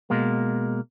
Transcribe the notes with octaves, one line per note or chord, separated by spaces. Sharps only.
B2 G#3 A#3